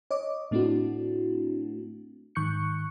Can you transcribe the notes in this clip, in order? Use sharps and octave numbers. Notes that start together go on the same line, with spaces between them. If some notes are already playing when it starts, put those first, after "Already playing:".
C#5 D#5 D6
A2 A3 C4 D4 E4 F#4
G#2 D#3 C#6 F#6 G6 C#7